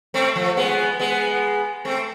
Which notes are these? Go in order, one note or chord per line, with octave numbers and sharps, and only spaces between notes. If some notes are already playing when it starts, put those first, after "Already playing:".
A3 C4
F3 A3
G#3 B3
G#3 B3
A3 C4